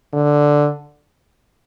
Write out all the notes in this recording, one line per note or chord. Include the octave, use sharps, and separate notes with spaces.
D3